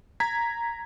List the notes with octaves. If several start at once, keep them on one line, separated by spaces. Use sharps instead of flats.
A#5 G#6 B6